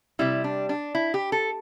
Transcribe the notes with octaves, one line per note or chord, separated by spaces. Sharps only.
C3 G3 E4
D4
D4
E4
G4
A4